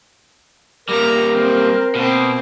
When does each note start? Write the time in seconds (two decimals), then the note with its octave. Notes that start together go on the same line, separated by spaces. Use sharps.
0.89 G3 A#3 A#4 A#5
1.33 C4
1.95 B2 A#3 C4